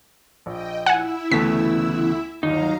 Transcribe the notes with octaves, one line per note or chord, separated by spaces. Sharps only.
A#1 D#5 G5
E4 E5 F#5 G#5
D2 C#3 E3 A3 B3 A5 B6
G1 D#2 F#3 D#4 F5 A#5